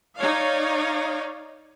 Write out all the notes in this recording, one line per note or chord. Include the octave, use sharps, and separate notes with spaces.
D#4 C#5 D5 F5